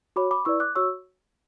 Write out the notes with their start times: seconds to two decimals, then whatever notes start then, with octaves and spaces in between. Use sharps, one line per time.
0.16 F#4 C#5 B5 D6
0.31 B5 D6
0.45 E4 B4 D5 C#6 E6
0.60 D6 F#6
0.75 F#4 C#5 C#6 E6